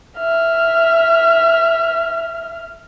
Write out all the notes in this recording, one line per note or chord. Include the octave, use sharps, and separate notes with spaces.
E5 F6